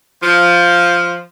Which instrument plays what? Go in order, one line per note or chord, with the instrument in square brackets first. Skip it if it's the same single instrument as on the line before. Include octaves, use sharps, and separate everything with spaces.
[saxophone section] F3